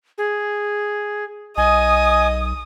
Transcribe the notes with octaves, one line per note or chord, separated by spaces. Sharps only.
G#4
B1 D#5 G#5 D#6